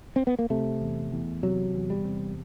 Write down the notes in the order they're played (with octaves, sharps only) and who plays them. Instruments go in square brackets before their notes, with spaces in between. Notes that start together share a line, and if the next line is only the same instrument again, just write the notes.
[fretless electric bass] C4
B3
A#3
C3 A3
E2
E2
C3 F#3
E2
G3
C3